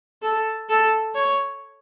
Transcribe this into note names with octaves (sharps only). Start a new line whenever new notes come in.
A4
A4
C#5